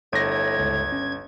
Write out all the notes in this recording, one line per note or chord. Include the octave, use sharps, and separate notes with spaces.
G1 A2 G#6 A#6
C#2
C#4